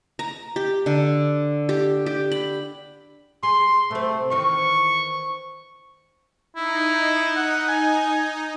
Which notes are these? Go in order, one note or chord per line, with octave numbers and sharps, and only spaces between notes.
A#5
G4
D3
G4
G4
B5
G#4 C6
C3 A3 C4
D#3 E3 C4 C#6
D#4 E4
F#5
G#5